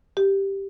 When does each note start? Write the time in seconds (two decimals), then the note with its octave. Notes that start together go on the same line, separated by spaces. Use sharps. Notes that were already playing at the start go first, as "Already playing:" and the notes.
0.17 G4